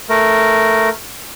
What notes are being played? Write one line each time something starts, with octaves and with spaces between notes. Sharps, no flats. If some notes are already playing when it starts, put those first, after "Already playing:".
A3 A#4